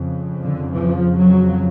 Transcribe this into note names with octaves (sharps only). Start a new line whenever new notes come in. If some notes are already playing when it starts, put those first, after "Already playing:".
Already playing: F2 C#3
D3
F3
F#3